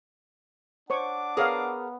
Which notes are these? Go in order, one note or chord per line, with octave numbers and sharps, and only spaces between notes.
D4 C5 C#5 F#5 C#6 D6
B3 G#4 A#4 B4 C#5 F5 F#5